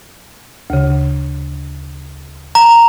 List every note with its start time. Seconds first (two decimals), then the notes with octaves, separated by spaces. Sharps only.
0.70 D2 C#3
2.55 A#5